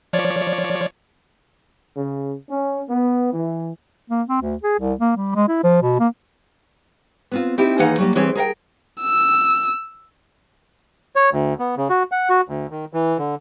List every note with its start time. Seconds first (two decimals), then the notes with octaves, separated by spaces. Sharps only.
0.13 F3 C#5 D5
1.97 C#3
2.49 C#4
2.89 B3
3.33 E3
4.10 A#3
4.29 C4
4.41 D2
4.63 G#4
4.80 C2
5.00 A#3
5.16 G3
5.35 G#3
5.48 E4
5.64 F3
5.82 B2
6.00 A#3
7.32 B3 C4 F4
7.58 C4 D#4 E4 G4
7.79 D#2 E3 D#4 G#4 F5 F#5
7.98 F#3 G3 A#3
8.15 E3 G3 C4 G#4 C#5
8.35 G#4 A#4 F5 G5
9.02 E6
11.16 C#5
11.33 D2
11.59 B3
11.77 C#3
11.90 F#4
12.12 F#5
12.30 F#4
12.49 D2
12.70 D#3
12.93 E3
13.18 D3